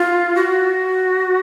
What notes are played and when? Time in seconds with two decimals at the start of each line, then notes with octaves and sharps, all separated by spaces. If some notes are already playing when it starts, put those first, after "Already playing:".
Already playing: F4
0.35 F#4